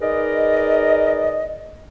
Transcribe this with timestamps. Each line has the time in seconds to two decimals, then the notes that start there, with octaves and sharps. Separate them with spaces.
0.01 D#4 G#4 A#4 B4 D5 D#5